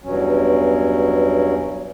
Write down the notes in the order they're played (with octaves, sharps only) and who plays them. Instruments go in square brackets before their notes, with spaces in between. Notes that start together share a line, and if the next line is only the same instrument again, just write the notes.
[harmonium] E2 G2 B2 F#3 C#4